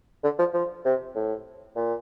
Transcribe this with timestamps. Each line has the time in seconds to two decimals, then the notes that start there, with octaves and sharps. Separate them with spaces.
0.24 D3
0.39 F3
0.54 F3
0.85 C3
1.16 A2
1.76 A#2